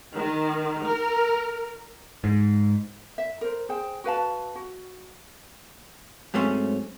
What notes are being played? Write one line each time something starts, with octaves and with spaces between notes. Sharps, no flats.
D#3
A#4
G#2
E5
A#4 C5
G#4 C5 G5
F#4 B4 F5 A5
F#4
G#2 F#3 A3 C4 C#4